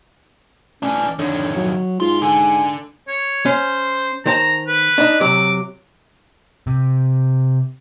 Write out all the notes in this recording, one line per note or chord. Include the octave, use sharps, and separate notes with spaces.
A1 E3 C#4 D4
F2 D3 D#3 C#5
F#3
D#2 G#2 F4 C6
D3 G#5
C#5
C#4 C5
D#3 C5 A5 A#5
B4
D4 D#4
C3 F#3 D6
C3